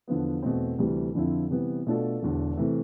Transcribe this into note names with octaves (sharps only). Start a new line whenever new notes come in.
E2 D3 F3 B3
E2 B2 A3 C4
D2 C3 E3 G3
F2 D3 F3 C4 E4
C3 E3 G3 B3
B2 A3 D4 F4 A4
E1 E2 D3
C3 E3 A3